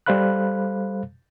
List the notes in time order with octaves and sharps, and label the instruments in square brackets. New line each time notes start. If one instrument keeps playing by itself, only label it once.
[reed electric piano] G3 A4 C5 F5 B5 F#6